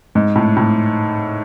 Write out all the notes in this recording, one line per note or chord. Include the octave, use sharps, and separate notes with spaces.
G#2
A2
A2